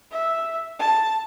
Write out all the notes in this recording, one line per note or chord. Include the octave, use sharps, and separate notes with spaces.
E5
A5